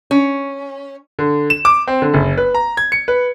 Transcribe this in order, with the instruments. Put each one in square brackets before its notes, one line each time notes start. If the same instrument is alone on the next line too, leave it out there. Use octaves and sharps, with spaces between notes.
[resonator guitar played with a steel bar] C#4
[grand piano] D3
E7
D6
C4
D3
F#1
B4
A#5
G#6
C#7
B4